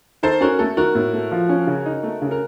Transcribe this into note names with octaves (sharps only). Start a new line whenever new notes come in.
D#3 A4 C5
C#4 F#4 A#4
A3 A4
D#3 F#4 A#4
A2
A3
F3
C#4
C#3
D#4
A3
C#3
A#4